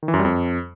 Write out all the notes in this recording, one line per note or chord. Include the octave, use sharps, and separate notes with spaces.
D#3
E3
F#2
G3
F2